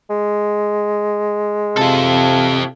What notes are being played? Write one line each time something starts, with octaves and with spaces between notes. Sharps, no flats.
G#3
C3 F4 A4